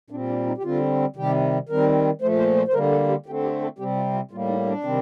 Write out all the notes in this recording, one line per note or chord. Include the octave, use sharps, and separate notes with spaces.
A#2 G3 C4 D4
D4
D#4
G4
D3 G3 C4 F4
C3 D#3 G3 G4
D#3 G3 C4 A#4
A#2 F3 A3 C5
C5
C5
C5
D3 G3 A#3 A#4
A4
G4
D3 A3 C4 G4
G4
A4
C3 G3 C4 G4
F4
F4
A2 G3 A#3 F4
D#4
D4
C3 D#3 G3 C4